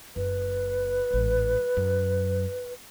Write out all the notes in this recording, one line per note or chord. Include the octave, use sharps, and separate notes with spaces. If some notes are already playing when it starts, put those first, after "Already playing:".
F#1 B4
A1 G#2
F#2